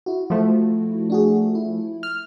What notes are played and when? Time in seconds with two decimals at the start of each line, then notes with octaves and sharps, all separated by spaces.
0.06 E4 F#4
0.30 F3 A3
1.10 D4 F#4 G#4
1.55 E4
2.03 F6